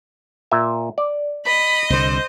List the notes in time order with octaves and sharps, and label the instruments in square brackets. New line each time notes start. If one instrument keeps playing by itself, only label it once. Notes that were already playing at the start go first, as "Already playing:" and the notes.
[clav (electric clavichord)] A#2 E5
D5
[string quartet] D#5 [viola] B5
[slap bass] C2 D3 [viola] C5